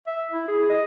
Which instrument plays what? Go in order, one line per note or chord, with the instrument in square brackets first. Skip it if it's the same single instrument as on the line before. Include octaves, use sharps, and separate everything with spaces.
[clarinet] E5
E4
G#4
D#5